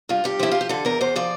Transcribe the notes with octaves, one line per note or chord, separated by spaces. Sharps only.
G2 F4
G2 G4
F3 E4
F3 F4
G4
D3 A4
E2 A#4
E2 C5
F3 D5